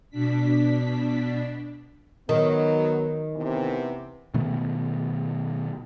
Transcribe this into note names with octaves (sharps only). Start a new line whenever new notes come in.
B2 D4 B6
D#3 F#3 B3
C3 E3 B3
B2 D#3 A3 B3